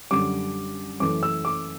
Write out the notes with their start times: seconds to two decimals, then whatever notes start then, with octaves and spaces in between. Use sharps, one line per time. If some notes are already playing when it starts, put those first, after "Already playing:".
0.11 F#2 D3 G3 D6
1.00 F#2 E3 A3 D6
1.23 E6
1.45 D6